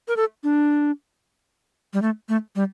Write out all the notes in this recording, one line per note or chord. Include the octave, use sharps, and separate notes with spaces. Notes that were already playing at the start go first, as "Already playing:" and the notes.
A#4
A4
D4
G3
A3
A3
G3